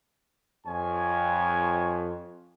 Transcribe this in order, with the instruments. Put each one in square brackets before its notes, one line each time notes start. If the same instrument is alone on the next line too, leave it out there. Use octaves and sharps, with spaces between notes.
[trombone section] F2 [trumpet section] C#5 G#5